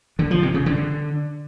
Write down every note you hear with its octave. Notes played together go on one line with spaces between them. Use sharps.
D3
F3
C3
C#3
D3